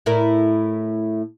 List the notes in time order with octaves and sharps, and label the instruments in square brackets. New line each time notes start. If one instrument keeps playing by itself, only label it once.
[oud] A2 E4 A#4